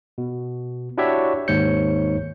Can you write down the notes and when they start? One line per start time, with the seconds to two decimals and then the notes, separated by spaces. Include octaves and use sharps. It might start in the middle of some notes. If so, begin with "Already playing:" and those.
0.18 B2
0.98 D4 E4 F#4 G4 C#5 E5
1.48 G#1 D#2 G#2 C#5 G6 C#7